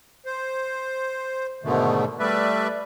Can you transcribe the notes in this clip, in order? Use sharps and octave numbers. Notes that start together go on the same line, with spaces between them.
C5
G#2 B2 D3 D#3 A3
G3 A3 B4 D5 E5